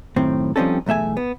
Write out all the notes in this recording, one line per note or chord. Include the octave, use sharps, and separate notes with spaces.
F#2 A2 D#3 C4
F3 G3 C4 C#4 D#4 A4
B1 E2 A3 E5 G#5
B3